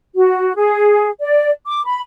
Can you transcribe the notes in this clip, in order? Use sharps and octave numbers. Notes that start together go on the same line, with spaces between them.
F#4
G#4
D5
D6
B5